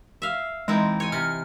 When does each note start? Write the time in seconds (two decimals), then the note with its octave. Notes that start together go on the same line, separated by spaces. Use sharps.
0.22 E5 F5
0.68 E3 G#3 C4 D#4
1.00 C#5 G#5
1.12 C3 F6